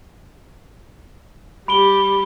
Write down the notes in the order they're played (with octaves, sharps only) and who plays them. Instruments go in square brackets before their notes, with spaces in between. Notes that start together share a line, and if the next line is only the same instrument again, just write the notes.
[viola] G3 G4 [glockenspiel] B5 D7 G7